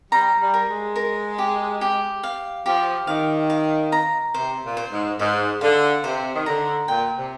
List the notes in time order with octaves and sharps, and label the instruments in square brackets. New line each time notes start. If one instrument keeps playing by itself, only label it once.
[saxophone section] G3 [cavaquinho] A#5
[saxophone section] G3
[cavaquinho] A#4
[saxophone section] G#3
[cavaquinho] A#4
G4
G4
F5
[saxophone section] F3 [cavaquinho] G4
[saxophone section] D#3 [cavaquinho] F5
[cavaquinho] F5
A#5
[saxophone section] C3 [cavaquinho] C5
[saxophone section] A#2
[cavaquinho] C5
[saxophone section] G#2
[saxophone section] G#2 [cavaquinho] C5
[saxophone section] D3 [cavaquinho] F5
[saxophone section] C3 [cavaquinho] C5
[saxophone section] D#3
[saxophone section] D3 [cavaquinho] A#5
[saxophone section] A#2 [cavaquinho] G5
[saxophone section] C3